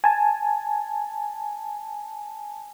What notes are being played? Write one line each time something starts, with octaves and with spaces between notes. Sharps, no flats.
G#5 A5